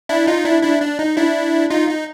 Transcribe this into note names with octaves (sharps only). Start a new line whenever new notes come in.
D4 E4
D#4 F4
D4 E4
D4 E4
D4
D#4
D4 E4
D#4 F4
D#4